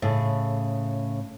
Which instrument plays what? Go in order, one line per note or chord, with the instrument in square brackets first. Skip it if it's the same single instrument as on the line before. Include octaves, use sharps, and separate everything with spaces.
[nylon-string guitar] A2 C#3